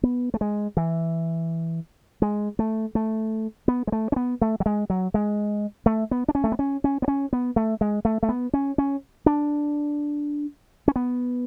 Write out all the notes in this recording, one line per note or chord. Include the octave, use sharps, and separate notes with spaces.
B3
A3
G#3
E3
G#3
A3
A3
B3
G#3
A3
C#4
B3
A3
F#3
G#3
F#3
G#3
A3
B3
D4
C#4
A3
B3
C#4
C#4
B3
C#4
B3
A3
G#3
A3
A3
B3
C#4
C#4
D4
C#4
B3